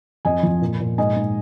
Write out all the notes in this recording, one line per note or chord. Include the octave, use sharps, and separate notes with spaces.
F2 D#5 G#5
F3
A#2
A#2
G#2 D#5 G#5
G#2